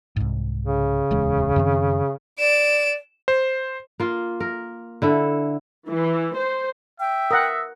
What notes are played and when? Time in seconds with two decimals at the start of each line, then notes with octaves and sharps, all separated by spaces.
0.16 C2 G#2
0.65 C#3
1.11 D1 E2 G#3
1.56 F#2 D#3 C4
2.39 D5 D7 E7
3.28 C5
4.00 A#3 F4
4.40 A#4
5.02 D3 E4 A4
5.87 E3
6.36 C5
7.00 E5 G5
7.31 A#4 F#5 D#6 E6 A#6